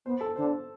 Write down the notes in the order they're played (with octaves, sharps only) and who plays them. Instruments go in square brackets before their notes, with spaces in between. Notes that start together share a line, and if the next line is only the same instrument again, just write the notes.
[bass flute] B3 [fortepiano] C5
[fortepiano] A4
[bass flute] D3 [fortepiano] C5